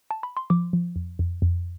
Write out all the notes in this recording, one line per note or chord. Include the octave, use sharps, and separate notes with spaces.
A5
B5
C6
F3 D6
F3
F2
F2
F2